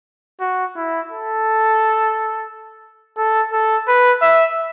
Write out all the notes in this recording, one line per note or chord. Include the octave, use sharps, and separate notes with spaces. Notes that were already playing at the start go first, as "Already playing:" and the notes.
F#4
E4
A4
A4
A4
B4
E5